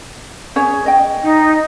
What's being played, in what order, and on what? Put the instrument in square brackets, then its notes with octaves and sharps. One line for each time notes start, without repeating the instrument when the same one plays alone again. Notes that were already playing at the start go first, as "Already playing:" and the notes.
[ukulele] C#4 G#4 C#5
D#5 G5
[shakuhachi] D#4